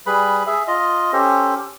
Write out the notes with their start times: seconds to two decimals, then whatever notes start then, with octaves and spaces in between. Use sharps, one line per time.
0.06 G3 G#4 B4 B5
0.47 G#4 E5
0.68 F4 D#5
1.13 C#4 G4 A4 C5